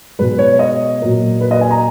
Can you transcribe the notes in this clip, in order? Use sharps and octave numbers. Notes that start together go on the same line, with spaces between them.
B2 G#3 B3 B4
C#5
D#5
A#2 F#3 A#3
B4
D#5
G#5
A#5